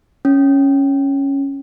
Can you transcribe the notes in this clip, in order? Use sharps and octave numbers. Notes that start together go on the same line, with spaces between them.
C#4